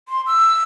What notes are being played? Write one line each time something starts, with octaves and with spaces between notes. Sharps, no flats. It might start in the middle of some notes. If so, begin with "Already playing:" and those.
C6
E6